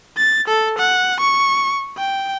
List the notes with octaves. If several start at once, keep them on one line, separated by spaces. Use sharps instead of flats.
A6
A4
F#5
C#6
G5